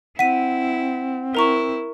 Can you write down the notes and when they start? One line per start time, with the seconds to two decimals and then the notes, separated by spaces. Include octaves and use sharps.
0.19 C4 E4 F#5 B6 D#7
1.35 E4 A#4 A#5 C#6